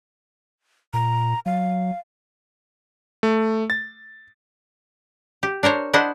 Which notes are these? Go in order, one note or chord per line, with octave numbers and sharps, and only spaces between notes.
A#2 A#5
F#3 F5
A3
A6
G4
D4 A#4 C5 C#5
D4 E4 C5 D#5 F#5